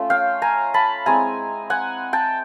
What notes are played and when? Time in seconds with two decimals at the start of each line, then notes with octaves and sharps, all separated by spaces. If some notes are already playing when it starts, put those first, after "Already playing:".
Already playing: A3 C#4 F4
0.10 F5 G5
0.42 G#5 A#5
0.74 A5 B5
1.06 G#3 C4 E4 G#5 A#5
1.70 F#5 G#5
2.13 G5 A5